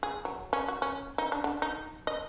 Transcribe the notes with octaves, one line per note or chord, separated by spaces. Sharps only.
G#4
F#3
C#4
F#4
C#4
D#4
D4
D3
D#4
D#5